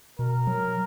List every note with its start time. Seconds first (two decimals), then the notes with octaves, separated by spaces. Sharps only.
0.19 B2 A#4
0.47 F#3